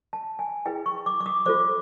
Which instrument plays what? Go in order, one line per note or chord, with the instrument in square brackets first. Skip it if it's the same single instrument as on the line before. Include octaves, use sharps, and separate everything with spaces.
[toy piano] A5
G#5
E4 G#4 B4 G5
C#6
D6
D6
D#6
F4 A4 C5 D6